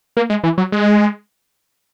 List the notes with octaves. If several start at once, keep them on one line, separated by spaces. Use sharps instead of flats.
A#3
G#3
E3
F#3
G#3